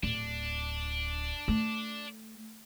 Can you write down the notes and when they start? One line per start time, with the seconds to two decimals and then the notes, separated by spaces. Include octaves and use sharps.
0.03 D1 D4
1.48 A3